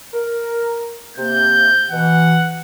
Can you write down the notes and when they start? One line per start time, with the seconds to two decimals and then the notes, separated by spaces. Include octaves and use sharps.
0.13 A#4
1.17 C3 A#3 G6
1.91 B2 E3 F#5